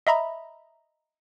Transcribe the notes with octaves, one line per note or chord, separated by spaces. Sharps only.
D#5 E5 A#5 B5